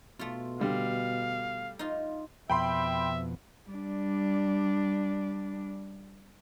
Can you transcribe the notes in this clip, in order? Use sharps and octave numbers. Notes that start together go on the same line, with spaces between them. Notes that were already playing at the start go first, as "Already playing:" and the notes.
B2 A3 F4
D3 G3 F5
D#4 F4
F2 B2 E5 G5 B5 C6
G3 D4